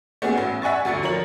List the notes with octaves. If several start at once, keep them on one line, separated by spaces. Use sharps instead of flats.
A3 B3 C#4 F#4 G#4
A1
E5 F#5 G#5 C#6 A6
D2 F#3 A6 C#7
F3 A#4 C#5 F#7